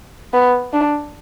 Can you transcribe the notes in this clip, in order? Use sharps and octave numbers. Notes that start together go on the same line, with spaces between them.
B3
D4